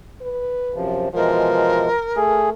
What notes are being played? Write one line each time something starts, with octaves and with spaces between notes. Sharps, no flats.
B4
F#2 C3 F3
B2 E3 F3 G#3 A#4
A3 G#4